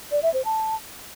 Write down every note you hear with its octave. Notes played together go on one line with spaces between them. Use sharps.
D5
E5
C5
A5